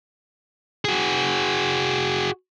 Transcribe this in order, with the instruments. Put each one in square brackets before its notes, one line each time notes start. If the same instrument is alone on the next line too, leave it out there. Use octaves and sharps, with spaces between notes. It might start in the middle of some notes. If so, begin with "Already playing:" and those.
[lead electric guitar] F#4 G#4